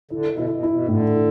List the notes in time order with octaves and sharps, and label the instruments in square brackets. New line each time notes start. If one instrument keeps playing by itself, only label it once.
[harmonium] D3 [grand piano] E4
[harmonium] B2
[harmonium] D3 [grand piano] E4
[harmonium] B2
[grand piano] E4
[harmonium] B2
[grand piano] A2 [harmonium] D3
[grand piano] E4